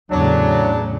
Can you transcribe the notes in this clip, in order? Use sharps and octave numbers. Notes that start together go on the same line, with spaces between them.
E2 A2 C#3 F#3 D4